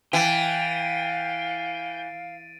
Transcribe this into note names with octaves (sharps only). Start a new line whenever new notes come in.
E3 F5 G5 A6 D7 D#7